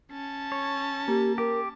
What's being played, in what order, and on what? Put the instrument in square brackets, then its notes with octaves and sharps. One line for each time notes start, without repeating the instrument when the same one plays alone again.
[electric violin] C#4 A5
[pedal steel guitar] C#5
[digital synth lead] A#3 [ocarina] G4
[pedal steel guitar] G4 [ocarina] A#4